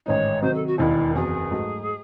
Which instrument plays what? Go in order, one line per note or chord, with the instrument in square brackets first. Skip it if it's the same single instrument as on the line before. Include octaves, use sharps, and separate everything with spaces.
[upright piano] A1 G#2 D#3 G#3 D#4 [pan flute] C#5
[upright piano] C3 D#3 F#3 [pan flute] C5
[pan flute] A4
F#4
[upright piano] E1 D#2 D#3 [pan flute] E4
[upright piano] F#1 E2 C3 F#3 [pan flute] G#4
[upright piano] G#2 F#3 A3 D#4 F#4